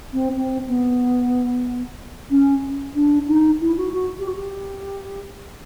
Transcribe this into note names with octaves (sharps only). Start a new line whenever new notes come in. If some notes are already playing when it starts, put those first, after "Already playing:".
C4
C4
B3
C#4
D4
D#4
E4
F#4
F#4
G4
F#4
G4